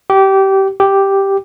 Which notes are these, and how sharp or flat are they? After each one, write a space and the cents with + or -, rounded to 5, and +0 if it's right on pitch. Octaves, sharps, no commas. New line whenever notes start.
G4 -20
G4 +0